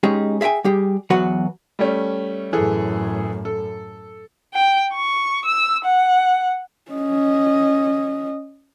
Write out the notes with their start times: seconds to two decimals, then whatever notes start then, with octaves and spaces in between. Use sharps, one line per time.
0.03 G#3 C#4 D#4 G4 G#4
0.41 G#4 E5 F5 G5 G#5
0.64 G3 G4 G#4
1.10 E2 F#3 F#4 B4 F#5
1.79 G3 A3 C#4
2.53 F#2 A2 E3 G#4 A4
3.45 A4
4.54 G5
4.94 C#6
5.46 E6
5.84 F#5
6.91 C#4 D#5